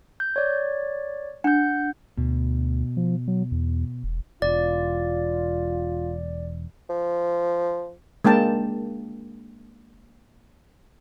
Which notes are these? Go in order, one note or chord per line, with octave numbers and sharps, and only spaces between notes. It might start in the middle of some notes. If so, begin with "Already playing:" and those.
G6
C#5 D5
D4 F#5 G6
D2 B2
F3
F#3
E2
E1
E1 F4 D5
F3
G#3 A#3 D4 G5 A5